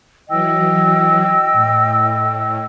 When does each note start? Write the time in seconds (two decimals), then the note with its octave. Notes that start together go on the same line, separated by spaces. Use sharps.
0.29 E3 F#3 D#5 G5 E6
1.53 A2